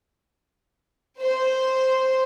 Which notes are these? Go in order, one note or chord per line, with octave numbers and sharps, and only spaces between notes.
C5